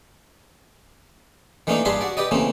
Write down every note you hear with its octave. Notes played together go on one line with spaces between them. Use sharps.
D#3 E3 A3 A#3 D4 D#4
G2 D4 F4 G#4 B5 C6
F#4 D5
G4 B4 D5 D#5
C#3 E3 A3 A#3 C4